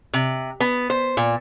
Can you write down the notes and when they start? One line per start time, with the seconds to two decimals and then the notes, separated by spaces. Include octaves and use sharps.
0.14 C3
0.60 B3
0.90 C5
1.17 A#2